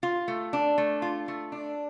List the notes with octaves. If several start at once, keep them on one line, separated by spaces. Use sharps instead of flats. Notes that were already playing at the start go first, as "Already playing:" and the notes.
F4
A3
D4
A3
F4
A3
D4